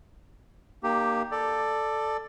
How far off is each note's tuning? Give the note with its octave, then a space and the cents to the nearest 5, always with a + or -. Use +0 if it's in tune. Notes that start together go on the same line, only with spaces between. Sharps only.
A#3 +0 D#4 -35 G4 +0
A4 +0 D5 +10